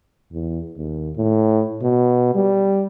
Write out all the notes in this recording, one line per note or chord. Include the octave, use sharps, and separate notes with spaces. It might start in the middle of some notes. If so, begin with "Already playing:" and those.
E2
D#2
A2
B2
G3